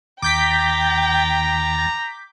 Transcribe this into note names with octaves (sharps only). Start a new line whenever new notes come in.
D#2 G5 A#5 D6 G6 A6 B6